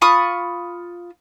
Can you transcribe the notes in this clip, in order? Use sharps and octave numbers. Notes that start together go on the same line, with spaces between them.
F4 B5 C#6 D#6